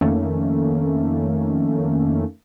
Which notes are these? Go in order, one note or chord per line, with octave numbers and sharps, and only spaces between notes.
F2 D#3 A3 A#3 C#4